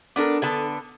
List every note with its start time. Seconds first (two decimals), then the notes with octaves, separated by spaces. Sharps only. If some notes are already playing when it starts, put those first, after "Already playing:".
0.16 B3 D4 A4 A#4 D6
0.42 D3 B3 A5